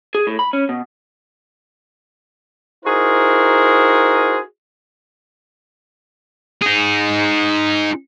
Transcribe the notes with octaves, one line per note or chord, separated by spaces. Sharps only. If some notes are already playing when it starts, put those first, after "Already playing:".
G#4
A2
B5
C#4
B2
D#4 E4 F#4 G#4 A#4 C5
D#4 G#4